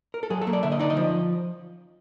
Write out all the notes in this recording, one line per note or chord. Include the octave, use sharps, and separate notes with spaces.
A#4
A4
F#3 G#4
A4
A#3
D5
D3 E5
D#5
D#4 D5
D#5
F3